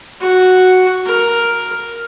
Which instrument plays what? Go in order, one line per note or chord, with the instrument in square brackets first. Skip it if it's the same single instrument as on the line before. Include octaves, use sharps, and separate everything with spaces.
[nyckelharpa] F#4
A#4